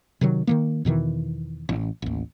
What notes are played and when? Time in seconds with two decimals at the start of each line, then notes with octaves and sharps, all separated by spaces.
0.21 C3 D#3 F#3
0.47 D#3 E3 A#3
0.85 E2 B2 D#3 E3
1.69 A1
2.02 A1 D#2